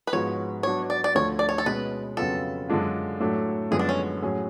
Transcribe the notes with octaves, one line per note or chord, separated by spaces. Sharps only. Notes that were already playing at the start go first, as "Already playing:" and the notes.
B4
G#2 F3 G#3 B3 F#4 C#5
F#3 B3 D4 F#4 C#5
D5
D5
D2 D3 F3 A3 C#5
D5
C#5
A4
B2 G#3 C#4 B4
F2 C#3 F#3 B3 F4 A4
F#2 D3 G#3 D4 F4
A2 F#3 A3 D4
F#2 D3 F3 G#3 B3 G#4
D4
C#4
A2 F#3 C#4 G#4